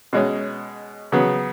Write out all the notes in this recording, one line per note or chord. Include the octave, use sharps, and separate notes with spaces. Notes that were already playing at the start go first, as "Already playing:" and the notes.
B2 G#3 C#4
C#3 F#3 B3